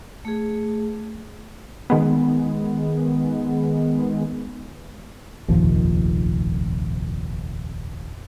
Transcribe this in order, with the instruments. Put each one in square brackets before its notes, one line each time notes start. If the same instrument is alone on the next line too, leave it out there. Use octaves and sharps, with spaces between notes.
[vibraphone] A3 G#4
[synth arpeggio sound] D#3 G#3 B3
[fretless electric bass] F1 A#1 D#2 F3